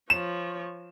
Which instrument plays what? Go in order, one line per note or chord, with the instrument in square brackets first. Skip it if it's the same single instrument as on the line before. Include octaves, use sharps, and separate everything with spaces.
[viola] F3 C#5 [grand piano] E7